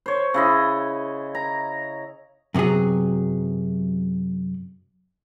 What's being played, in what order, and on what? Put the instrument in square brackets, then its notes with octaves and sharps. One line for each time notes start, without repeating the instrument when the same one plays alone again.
[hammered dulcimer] C5 C#5
C#3 E4 D#5
A#5
[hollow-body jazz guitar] F#2 C3 F#3 B3 G#4